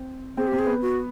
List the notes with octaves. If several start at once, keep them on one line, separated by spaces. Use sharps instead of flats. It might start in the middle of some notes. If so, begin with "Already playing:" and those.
Already playing: C4
C4 G#4
C4 G4
G#4
B3
F#4